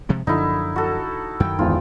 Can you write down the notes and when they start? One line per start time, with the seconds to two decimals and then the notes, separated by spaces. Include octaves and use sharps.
0.09 C3 F3 G#3
0.27 F#2 D3 F3 D#4 E4
0.76 F#4 A4
1.40 F#2 D#3 G5
1.59 G#1 E2 F4